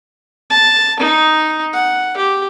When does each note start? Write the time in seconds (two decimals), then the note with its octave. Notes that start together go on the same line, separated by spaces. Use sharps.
0.50 A5
1.00 D#4
1.73 F#5
2.17 G4